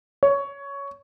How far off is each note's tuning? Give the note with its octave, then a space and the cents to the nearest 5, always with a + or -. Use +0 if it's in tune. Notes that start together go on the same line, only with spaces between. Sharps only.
C#5 +10